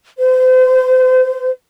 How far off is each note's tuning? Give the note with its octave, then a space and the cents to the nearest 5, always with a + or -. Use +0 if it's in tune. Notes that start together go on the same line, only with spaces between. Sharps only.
C5 -35